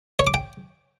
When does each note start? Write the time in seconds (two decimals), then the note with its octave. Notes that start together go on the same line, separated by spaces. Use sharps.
0.19 C#5
0.27 D6
0.34 G5